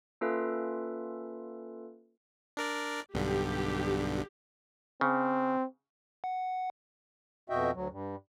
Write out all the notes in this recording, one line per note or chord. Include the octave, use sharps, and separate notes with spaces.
A#3 C#4 F4 A4 B4 E5
D4 A#4 D5
B1 G2 D3 G4
C#3 C4
F#5
F2 B2 F#4 D#5 E5 G5
D2 F#3
G2